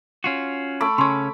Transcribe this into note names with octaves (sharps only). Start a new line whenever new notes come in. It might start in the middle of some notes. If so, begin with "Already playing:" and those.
C#4 F4 F#4
A3 B5 D6
C#3 C#4 C6 C#6